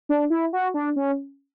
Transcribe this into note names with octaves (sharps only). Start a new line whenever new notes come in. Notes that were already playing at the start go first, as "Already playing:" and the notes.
D4
E4
F#4
D4
C#4